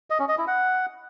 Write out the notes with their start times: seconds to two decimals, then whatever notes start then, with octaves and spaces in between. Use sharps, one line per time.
0.10 D#5
0.19 C#4
0.29 D#5
0.38 E4
0.47 F#5